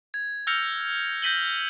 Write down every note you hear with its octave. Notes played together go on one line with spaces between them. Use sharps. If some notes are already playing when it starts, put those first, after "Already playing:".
G#6
E6 F6 G6 A#6 C#7 F7
G6 A#6 B6 D#7 F#7 G7